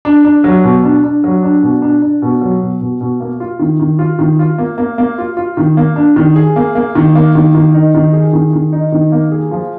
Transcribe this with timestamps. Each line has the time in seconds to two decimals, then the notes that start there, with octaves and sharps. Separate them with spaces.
0.05 D4
0.25 D4
0.44 F#3
0.64 B2
0.83 D4
1.04 D4
1.24 F#3
1.43 D4
1.62 B2
1.82 D4
2.02 D4
2.22 B2
2.41 F#3
2.61 B2
2.81 B2
3.01 B2
3.20 A#3
3.40 F4
3.59 D#3
3.80 D#3
3.99 F4
4.19 D#3
4.39 F4
4.58 A#3
4.78 A#3
4.98 A#3
5.18 F4
5.37 F4
5.57 D#3
5.77 A#3
5.96 D4
6.16 D#3
6.36 G#4
6.56 A#3
6.75 A#3
6.95 D#3
7.15 A#3
7.35 D#3
7.55 D#3
7.74 D#4
7.95 D#3
8.13 G#4
8.33 D#3
8.53 D#3
8.72 D#4
8.92 D#3
9.12 A#3
9.31 G#4
9.51 F3